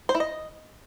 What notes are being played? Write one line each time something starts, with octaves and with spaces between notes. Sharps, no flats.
C5
E4
D#5